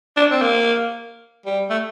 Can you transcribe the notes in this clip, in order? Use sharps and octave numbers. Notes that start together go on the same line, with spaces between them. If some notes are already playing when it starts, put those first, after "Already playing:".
D4
C4
A#3
G3
A3